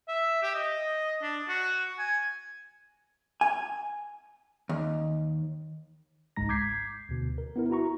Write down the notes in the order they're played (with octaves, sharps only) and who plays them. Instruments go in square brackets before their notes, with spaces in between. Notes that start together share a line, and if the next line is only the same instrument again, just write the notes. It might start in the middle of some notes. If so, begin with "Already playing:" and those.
[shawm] E5
G4
D#5
D4
F#4
G#5
[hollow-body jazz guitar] G#5
D#2
[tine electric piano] G#1 C#2 G#2 G#3 A#5 A#6
D6 G6 G#6 B6 C7
D2 B2 D3
A#4
B3 E4 A#4
E4 F#4 A#5 C#6